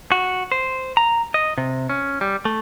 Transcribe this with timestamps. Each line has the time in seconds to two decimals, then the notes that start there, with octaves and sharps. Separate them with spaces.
0.12 F#4
0.52 C5
0.97 A#5
1.34 D#5
1.58 C3
1.89 C#4
2.21 G3
2.45 A3